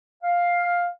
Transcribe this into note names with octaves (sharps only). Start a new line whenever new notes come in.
F5